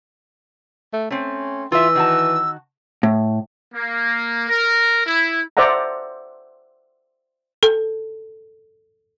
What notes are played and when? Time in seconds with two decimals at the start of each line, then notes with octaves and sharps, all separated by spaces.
0.93 A3
1.10 A3 C4 C#4
1.72 E3 F4 E5 E6
1.95 D#3 F#4 A5
3.03 A2
3.75 A#3
4.49 A#4
5.07 E4
5.57 C5 D5 E5 F#5 A#5
7.63 A4